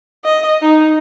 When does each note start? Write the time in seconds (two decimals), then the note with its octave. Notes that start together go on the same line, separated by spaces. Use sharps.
0.25 D#5
0.62 D#4